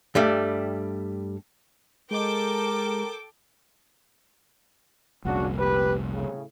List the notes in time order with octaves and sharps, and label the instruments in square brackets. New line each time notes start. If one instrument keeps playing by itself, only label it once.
[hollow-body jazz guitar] G2 G3 A3
[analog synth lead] G#3 [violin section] A4 G5 D6 [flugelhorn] A#4
[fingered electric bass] F1 C2 A#2 [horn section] C#3 D4 F#4
[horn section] G4 B4
A2 C#3